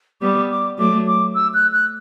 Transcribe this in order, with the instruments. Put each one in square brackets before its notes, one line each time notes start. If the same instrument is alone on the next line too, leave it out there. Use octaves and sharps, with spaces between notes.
[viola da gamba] G3 B3 [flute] D6
[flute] D6
[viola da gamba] F#3 A3 [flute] D6
[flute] D6
E6
F#6
F#6